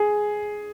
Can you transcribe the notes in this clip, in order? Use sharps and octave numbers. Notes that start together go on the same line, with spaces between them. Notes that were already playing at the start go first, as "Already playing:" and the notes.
Already playing: G#4